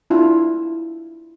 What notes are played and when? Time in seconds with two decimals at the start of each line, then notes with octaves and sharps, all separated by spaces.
0.10 D4 E4 F4